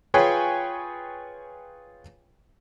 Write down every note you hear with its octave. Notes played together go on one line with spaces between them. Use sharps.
F4 G#4 B4 C#5 G5 G#5